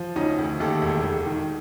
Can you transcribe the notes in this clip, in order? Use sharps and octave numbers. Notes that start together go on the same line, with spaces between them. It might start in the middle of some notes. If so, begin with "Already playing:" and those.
Already playing: F3
D2 C#4 D#4
D2
D#2 G4 A4
E1
E1
D#3